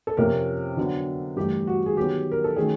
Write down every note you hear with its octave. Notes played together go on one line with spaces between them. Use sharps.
A4
F2 C3 F3 A#3 C#4 A#4
D3 F#3 B3 D4
G2 E3 A3 G4
F#4
G#4
D#3 F#3 B3 G4
A#4
A4
D#3 F#3 A3 C#4 G#4